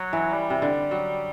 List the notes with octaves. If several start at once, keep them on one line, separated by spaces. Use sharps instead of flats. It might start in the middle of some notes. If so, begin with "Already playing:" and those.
Already playing: F#3
E3
G3
C3
D3
F#3